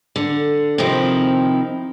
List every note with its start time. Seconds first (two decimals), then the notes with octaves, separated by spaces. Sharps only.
0.16 D3
0.78 C3 D#3 F3 C4 D#4 E4